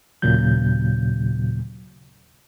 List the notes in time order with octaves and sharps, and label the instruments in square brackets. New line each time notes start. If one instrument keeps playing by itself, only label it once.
[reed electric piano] D#2 A#2 C#3 F#3 G6